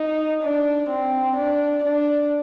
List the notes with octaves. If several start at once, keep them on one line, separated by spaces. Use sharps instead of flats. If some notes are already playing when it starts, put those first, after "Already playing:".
Already playing: D#4
D4
C4
D4
D4